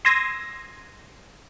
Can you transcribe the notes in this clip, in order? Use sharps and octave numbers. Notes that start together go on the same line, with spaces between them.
C6 D#6 E6 G#6 A#6